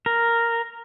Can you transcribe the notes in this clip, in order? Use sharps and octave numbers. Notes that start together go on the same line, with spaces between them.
A#4